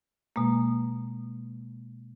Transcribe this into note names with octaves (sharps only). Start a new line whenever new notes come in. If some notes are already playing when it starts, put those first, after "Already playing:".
B2 G#3 A#3